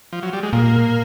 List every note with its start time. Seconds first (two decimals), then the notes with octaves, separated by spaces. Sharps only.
0.13 F3
0.23 F#3
0.33 G3
0.43 G#3
0.53 A#2 A#3